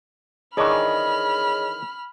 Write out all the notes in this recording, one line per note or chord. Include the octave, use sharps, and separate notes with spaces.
D#3 E3 D4 G#4 C#5 D#5 B5 F6